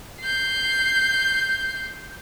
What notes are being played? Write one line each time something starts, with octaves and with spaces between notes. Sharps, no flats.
G6 C7